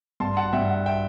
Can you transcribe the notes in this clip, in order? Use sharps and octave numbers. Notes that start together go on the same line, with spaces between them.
G2 A5 C6
F#5 A5
G2 E5 G5
F#5
E5 G5